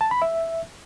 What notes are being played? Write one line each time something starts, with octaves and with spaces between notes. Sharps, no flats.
A5
B5
E5